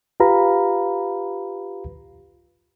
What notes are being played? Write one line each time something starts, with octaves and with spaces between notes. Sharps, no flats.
F4 G4 B4 F5 A#5 B5